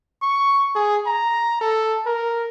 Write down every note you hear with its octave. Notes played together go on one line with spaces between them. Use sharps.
C#6
G#4
A#5
A4
A#4